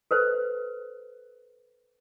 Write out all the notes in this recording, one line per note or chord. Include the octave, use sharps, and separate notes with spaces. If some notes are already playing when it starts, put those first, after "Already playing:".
A4 B4 C5